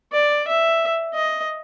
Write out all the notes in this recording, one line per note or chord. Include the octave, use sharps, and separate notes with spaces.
D5
E5
D#5